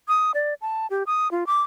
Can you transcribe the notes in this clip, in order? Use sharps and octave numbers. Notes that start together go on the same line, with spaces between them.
D#6
D5
A5
G4
D#6
F4
D6